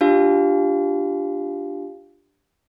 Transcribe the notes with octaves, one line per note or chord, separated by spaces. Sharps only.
D4 F4 G4 F5